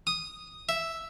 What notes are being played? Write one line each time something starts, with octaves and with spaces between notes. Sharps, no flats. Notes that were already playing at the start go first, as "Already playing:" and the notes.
D#6
E5